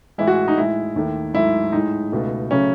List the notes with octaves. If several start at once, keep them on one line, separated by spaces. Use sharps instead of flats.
A2 E3 G#3 E4
F#4
D#4
A2 G#3 E4
D#2 D#3 A3
G#2 F#3 A3 E4
A2 G#3 D#4
C#2 B2 A3
C#3 F#3 A3 C#4